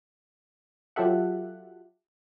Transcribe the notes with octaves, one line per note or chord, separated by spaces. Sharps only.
F#3 F4 G4 A4 E5 F#5